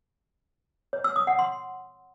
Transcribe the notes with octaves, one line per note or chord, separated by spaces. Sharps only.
C#5
E6
D#6
F#5
C6